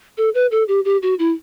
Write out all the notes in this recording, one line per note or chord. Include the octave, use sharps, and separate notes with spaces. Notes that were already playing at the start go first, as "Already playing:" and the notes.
A4
B4
A4
G4
G4
F#4
E4